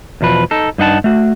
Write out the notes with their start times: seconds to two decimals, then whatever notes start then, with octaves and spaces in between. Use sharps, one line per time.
0.21 E2 B2 F3 B4
0.51 D#4 A4
0.78 G2 D#4 F#5 A5
1.04 A3 F#4